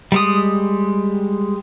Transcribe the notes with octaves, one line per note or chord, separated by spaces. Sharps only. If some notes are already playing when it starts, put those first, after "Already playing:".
G3 G#3 D#6